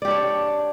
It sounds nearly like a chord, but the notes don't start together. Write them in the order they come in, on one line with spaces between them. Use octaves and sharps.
D5 G4 D4 C#5